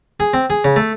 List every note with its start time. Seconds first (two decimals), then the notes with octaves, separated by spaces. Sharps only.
0.20 G#4
0.34 C4
0.50 G#4
0.64 C#3
0.76 A3